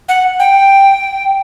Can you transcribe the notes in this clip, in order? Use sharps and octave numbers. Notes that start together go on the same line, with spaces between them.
F#5
G5